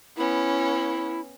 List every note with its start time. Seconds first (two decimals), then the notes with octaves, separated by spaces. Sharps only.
0.17 B3 C#4 E4